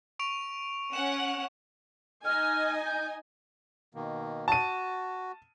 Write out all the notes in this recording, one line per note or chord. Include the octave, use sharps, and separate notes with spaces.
C#6 D7 F7
C#4 F#5 E7
D#4 D#5 G#5 F6
G6
B2 D#3 A#3
F#4 A5 D#7